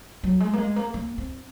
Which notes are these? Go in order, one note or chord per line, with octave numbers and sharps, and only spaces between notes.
F#3
G#3
A#3
G#3
A#3
A#3
C4